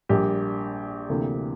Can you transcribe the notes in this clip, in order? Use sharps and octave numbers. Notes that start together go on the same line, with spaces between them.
A#1 A#2 G3 A#3 G4
D2 C3 E3 A#3